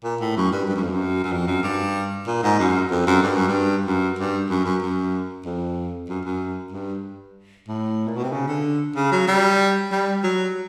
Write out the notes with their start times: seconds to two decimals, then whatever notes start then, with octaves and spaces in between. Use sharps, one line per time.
0.04 A#2
0.21 A2
0.37 F#2
0.52 G2
0.69 G2
0.76 F#2
0.83 F2
0.90 F#2
1.24 F#2
1.32 F2
1.47 F#2
1.63 G2
2.28 A#2
2.44 G#2
2.60 F#2
2.91 F2
3.07 F#2
3.23 G2
3.36 F#2
3.48 G2
3.86 F#2
4.19 G2
4.50 F#2
4.66 F#2
4.82 F#2
5.46 F2
6.09 F#2
6.25 F#2
6.72 G2
7.68 A2
8.08 A#2
8.17 B2
8.24 C3
8.32 C#3
8.48 D3
8.96 C#3
9.12 F#3
9.28 G3
9.92 G3
10.24 F#3